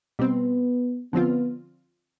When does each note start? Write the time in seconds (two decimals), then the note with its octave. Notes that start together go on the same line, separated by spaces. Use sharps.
0.19 B2 G3 B3 C4
1.13 D3 F3 B3 C4 F4